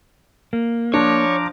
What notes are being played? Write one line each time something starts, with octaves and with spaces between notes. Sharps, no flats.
A#3
F3 D4 C#5 A#5 D6